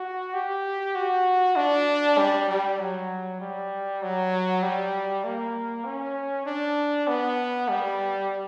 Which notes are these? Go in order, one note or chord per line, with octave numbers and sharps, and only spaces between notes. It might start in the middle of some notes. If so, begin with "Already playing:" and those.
Already playing: F#4
G4
F#4
D4
G3
G3
F#3
G3
F#3
G3
A#3
C#4
D4
B3
G3